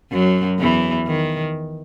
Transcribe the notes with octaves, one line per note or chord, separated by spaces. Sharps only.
F#2 F#3
E2 E3
D#3